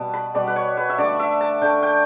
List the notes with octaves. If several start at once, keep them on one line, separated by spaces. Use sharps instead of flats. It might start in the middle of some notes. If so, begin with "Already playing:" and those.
Already playing: B2 G3 B3 A5
B5
B2 G3 B3 D5
B4
C#5
B4
E5
D3 A3 D5
E5
A5
D3 A3 G5
G5